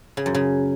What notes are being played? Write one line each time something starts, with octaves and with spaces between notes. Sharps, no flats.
C#3
F#2
C#3